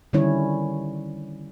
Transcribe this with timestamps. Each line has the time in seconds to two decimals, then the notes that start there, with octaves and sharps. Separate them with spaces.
0.13 D3 D#3 G3 C#4 E4 C#5